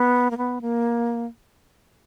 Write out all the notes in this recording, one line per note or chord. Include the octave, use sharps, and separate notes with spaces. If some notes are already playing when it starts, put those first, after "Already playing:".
Already playing: B3
A#3
B3
A#3